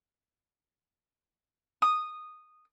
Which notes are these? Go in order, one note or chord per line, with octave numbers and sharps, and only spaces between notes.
D#6